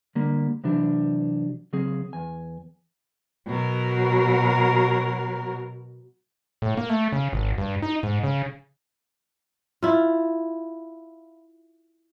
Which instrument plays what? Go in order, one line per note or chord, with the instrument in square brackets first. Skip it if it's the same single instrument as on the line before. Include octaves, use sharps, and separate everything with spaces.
[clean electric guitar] D3 G3 A#3
C3 E3 F#3 D4 G4
C#3 F#3 C4 G#4
E2 G#5
[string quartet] B2 F#3 A#4
[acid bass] A2
A#3
A3
C#3
G#1
G2
D#4
G#2
C#3
[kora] E4 F4